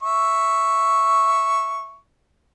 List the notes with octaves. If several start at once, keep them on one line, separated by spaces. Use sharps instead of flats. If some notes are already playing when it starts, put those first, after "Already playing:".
E5 C#6